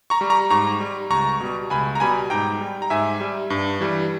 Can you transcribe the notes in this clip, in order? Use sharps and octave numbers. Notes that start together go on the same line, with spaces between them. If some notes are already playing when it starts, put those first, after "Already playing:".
A#5 C#6
G3
A#5 C#6
G#2 A#5 C#6
G3
C#2 A#5 C#6
B2 G3
C#2 G#5 B5
A#5
B2 G3 G#5 B5
G#2 G5 A#5
G3
A#5
G#2 E5 G#5
G3
G2
E3 G3